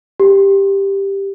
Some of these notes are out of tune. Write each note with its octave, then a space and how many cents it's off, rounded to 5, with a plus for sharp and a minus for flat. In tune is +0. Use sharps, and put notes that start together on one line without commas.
G4 +5